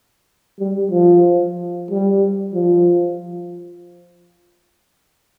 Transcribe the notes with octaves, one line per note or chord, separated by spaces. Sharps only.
G3
F3
G3
F3